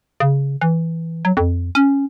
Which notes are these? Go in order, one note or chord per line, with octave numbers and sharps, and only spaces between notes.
C#3
E3
F#3
F2
C#4